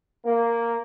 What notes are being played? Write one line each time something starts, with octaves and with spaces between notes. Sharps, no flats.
A#3